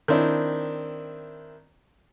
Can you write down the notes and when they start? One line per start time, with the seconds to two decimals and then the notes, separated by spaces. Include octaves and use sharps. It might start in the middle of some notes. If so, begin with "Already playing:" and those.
0.08 D#3 C4 D4 E4